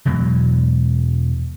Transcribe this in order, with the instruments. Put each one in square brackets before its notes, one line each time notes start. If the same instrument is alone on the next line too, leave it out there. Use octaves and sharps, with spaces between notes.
[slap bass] E2 B2 F#3 G#3